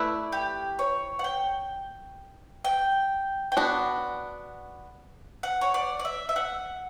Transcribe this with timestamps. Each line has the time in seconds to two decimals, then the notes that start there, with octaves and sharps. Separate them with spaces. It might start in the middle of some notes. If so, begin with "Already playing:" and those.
Already playing: A3 E4 B4 D5
0.32 G4
0.79 C#5
1.19 F#5
1.24 G5
2.64 G5
3.52 G5
3.57 B3 D4 F#4 F#5
5.43 F#5
5.61 C#5
5.74 D5
5.99 D5
6.05 E5
6.29 E5
6.36 F#5